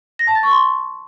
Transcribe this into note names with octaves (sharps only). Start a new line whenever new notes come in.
A#6
A5
A6
C#6
C6